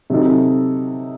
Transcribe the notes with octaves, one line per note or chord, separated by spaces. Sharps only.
C3 F#3 C4 D#4 A4